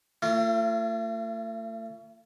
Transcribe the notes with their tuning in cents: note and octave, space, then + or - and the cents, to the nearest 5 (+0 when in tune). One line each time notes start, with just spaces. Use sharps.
A3 +40 F4 -30